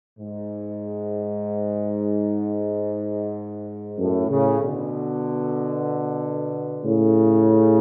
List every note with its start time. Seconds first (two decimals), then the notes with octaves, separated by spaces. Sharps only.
0.19 G#2
3.98 F#2 A2
4.29 A2 C#3
4.61 B2 D3
6.83 A2 C#3